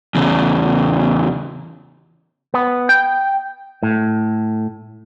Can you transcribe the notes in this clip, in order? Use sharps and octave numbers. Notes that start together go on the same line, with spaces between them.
E2 C#3
B3
G5
A2